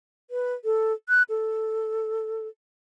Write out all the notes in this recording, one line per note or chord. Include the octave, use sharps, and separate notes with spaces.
B4
A4
F#6
A4